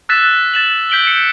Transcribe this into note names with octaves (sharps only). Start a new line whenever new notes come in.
E6 F#6 A6 B6 E7
A6 E7 F#7
G6 B6 D7 F#7 G7
C#7